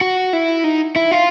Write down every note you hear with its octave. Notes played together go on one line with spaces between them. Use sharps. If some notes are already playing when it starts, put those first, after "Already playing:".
F#4
E4
D#4
E4
F4